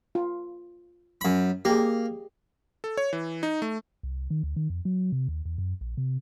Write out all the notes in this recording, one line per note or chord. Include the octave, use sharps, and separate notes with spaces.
F4
F#2 B5
A#3 G4 G#4
A4
C#5
E3
D#4
A3
C2
D#3
D2
D#3
F2
F#3
C3
D#2
E2
F#2
A#1
C3